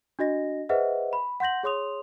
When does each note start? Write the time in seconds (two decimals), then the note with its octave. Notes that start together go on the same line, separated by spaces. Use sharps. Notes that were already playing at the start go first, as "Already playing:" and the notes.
0.19 D4 F#4 D#5 A#6
0.69 G#4 B4 C5 D#5 E5 F#5
1.13 B5
1.40 F#5 C6 G6 A#6 F#7
1.63 G#4 C#5 C6 D#6 F7